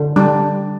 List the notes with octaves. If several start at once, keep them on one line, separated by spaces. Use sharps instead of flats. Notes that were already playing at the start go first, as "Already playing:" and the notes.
Already playing: D3
G3 D4